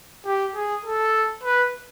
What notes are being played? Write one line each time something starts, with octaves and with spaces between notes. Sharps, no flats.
G4
G#4
A4
B4